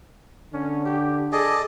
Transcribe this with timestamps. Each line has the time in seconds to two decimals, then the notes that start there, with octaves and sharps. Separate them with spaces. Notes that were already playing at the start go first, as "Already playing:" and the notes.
0.54 D3 C#4
0.85 G4
1.32 G#4 A4 D5 D#5